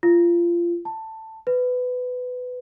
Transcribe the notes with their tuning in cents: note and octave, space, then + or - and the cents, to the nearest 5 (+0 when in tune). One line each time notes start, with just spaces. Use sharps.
F4 -25
A5 +10
B4 +15